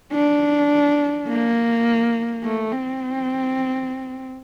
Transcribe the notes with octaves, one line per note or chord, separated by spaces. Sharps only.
D4
A#3
A3
C4